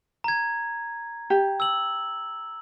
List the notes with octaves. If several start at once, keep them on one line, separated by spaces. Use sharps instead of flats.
A#5 G#6
G4
E6 F#7